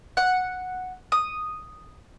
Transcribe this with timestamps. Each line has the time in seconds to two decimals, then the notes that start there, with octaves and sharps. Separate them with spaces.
0.17 F#5
1.12 D#6